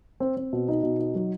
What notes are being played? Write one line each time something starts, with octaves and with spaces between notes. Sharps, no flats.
C4
C4
B2
D#4
B2
D#4
F#3